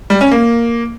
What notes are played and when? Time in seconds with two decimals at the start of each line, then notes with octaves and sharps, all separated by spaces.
0.10 G3
0.21 C#4
0.31 A#3